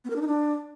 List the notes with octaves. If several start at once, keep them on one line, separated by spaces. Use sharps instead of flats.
B3
A#4
D4
D#4
D4